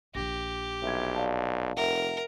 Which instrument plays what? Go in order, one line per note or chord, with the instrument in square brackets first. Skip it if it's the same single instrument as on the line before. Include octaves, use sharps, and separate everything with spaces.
[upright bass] A#1 F3 [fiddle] G4 [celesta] A#6
[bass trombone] B1 [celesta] E5 G#6
[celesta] D5 F5 A5
[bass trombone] F1 [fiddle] A#4 [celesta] E5 F#5